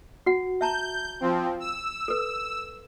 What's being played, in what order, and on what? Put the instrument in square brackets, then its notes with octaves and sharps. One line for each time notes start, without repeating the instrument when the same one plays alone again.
[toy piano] F#4 F#5
[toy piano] E5 A5 A#5 [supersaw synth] G6
[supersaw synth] F3 C4
E6
[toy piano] A4 B4